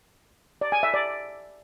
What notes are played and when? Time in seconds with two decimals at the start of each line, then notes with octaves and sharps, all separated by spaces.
0.61 D5
0.72 G#5
0.83 E5
0.94 D5